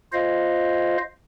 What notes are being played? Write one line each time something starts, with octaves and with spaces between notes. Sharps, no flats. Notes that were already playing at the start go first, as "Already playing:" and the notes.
F4 C5 D#5 F5